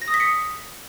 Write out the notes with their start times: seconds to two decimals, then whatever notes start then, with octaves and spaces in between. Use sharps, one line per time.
0.02 A#6
0.08 D#6
0.14 B6
0.20 C#7